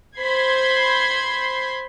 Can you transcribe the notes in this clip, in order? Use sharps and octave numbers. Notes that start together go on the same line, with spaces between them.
C5 B5 C6 G#6